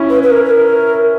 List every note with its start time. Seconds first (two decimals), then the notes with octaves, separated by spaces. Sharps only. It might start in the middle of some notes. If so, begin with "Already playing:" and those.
Already playing: C#4 E4
0.09 B4
0.22 B4
0.30 A#4
0.44 B4
0.50 A#4